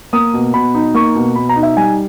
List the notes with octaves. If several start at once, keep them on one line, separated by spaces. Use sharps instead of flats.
A#3 D#6
B2
B2 B5
D#4
A#3 C#6
B2
B2 B5
A#5
D#4
E5
G3 G#5